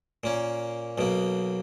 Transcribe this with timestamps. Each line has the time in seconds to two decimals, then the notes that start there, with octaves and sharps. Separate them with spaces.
0.24 A#2 A#3 C#4
0.98 B1 B2 A#3